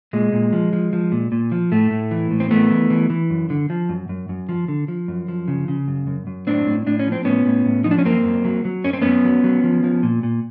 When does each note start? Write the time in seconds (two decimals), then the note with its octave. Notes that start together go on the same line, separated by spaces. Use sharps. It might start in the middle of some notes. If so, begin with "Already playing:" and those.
0.13 A#2 G#3
0.32 A#2
0.53 F3
0.73 F3
0.93 F3
1.12 A#2
1.32 A#2
1.52 F3
1.72 A2 A3
1.91 A2
2.11 E3
2.31 A2
2.40 C4
2.51 E3 A3 B3
2.70 E3
2.90 E3
3.10 E3
3.30 F#2
3.50 D3
3.70 F3
3.89 F#2
4.09 F#2
4.29 F#2
4.49 F3
4.68 D3
4.88 F3
5.08 F#2
5.28 F3
5.48 C#3
5.68 C#3
5.88 F#2
6.07 F#2
6.27 F#2
6.47 A2 C4 D4
6.67 A2
6.86 A2 D4
6.99 C#4
7.07 F3
7.12 C4
7.25 A2 B3 C#4
7.46 A2
7.65 A2
7.84 F3 D#4
7.91 D4
7.98 C#4
8.05 F#2 A#3 C4
8.25 F#2
8.45 F#3
8.65 F#3
8.84 F#2 C#4
8.93 C4
9.02 F#2 B3 C#4
9.25 F#3
9.44 F#3
9.64 F3
9.84 F3
10.03 A#2
10.23 A#2